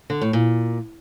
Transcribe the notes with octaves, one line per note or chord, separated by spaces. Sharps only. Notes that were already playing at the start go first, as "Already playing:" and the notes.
D3
A2
A#2